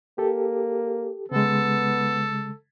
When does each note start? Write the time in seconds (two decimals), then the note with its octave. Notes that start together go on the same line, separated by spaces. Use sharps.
0.18 A#3 G4 A4
1.31 C#3 G#3 B3 A4